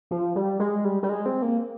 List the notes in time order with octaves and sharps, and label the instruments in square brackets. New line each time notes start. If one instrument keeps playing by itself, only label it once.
[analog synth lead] F3
G3
G#3
G3
G3
G#3
C4
A#3